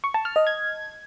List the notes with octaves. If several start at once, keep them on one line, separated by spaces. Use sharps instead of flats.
C#6
A5
F6
D#5
G#6